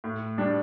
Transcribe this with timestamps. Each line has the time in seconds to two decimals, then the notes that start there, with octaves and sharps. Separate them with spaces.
0.04 A2
0.38 G3 D4